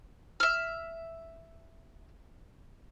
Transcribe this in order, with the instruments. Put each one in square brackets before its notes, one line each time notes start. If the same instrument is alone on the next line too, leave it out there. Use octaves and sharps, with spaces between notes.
[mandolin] E5 F6